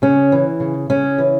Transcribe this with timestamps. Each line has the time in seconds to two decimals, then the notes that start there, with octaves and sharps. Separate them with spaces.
0.02 C#3 C#4
0.32 E3
0.60 C#3
0.90 C#3 C#4
1.18 E3